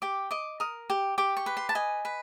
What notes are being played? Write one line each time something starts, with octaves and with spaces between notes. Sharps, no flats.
G4 D6
D#5 D6
A#4 D#6
G4
G4 D6
C#6
B4
C6
A5
D#5 G#5
B4